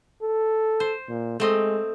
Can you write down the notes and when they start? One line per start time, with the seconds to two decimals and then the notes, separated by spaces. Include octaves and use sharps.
0.23 A4
0.80 C5
1.09 A#2
1.40 G#3 A3 C4 D#5